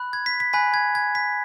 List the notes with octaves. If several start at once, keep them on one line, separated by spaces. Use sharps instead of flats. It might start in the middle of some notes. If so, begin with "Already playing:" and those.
Already playing: B5 F#6
G#6
B6
B6
G#5 B5 F#6 B6
G#6
G#6
B6